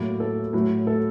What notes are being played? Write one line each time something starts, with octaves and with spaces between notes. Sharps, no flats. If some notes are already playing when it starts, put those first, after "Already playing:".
Already playing: A2 F#3 A#3
A4
A2 F#3 A3
A4